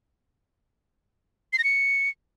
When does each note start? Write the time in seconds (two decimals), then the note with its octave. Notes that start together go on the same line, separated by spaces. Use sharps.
1.53 C7
1.58 A#6
1.64 C#7